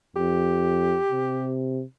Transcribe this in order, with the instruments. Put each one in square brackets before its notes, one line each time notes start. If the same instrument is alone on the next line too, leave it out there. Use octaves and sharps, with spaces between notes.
[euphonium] F2 [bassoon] G4
[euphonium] C3